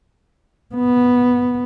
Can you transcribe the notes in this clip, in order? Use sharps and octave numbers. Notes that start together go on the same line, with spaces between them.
B3